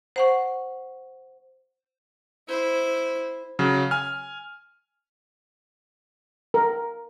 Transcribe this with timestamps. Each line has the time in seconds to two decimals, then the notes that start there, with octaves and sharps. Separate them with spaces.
0.16 C5 F#5 C#6
2.48 E4 C5
3.59 C#3 F#3
3.91 G#5 F6
6.54 A#4